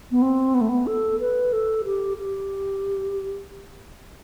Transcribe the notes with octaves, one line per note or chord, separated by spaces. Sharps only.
B3
C4
B3
A3
B3
A4
B4
A4
G4
G4